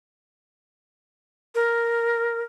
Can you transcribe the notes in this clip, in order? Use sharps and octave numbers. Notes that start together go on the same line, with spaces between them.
A#4